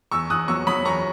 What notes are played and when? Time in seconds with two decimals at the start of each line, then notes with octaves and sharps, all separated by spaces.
0.11 E2 C#6 E6
0.30 E2 D#6 F#6
0.48 F#3 C#6 E6
0.67 F#3 B5 D#6
0.85 E2 A#5 C#6